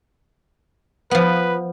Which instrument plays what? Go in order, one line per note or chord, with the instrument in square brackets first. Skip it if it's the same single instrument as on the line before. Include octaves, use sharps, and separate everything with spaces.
[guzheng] F3 B3 [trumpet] B4